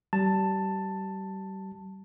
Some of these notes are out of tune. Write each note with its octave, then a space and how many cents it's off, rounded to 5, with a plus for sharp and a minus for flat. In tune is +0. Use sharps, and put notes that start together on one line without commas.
G3 -30 A5 +10